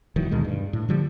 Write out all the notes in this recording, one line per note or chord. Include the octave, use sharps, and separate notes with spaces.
D#1 D#3 E3 F#3
D2 B2 D#3 G#3
G2
A2
D3 F3 G3